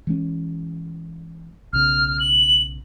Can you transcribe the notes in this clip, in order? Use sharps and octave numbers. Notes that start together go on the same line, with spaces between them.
E3 G#3 C#4
B1 C#3 F6
F#7